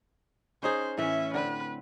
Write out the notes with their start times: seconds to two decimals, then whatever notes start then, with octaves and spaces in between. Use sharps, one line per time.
0.63 C#4 D#4 G#4 C5
0.98 A2 E3 C#4 E5
1.34 D3 C4 B4